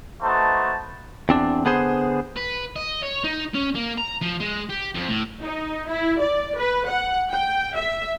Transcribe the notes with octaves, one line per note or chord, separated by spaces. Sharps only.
A3 D#4 F#4 B4 C5 A5
E2 C4 D4
D3 B3 G#4 C5
B4
D#5
C#5
D#4
C#4
A#3
A#5
F3
G#3
G4
F2
A2
D#4
E4
D5
B4
F#5
G5
E5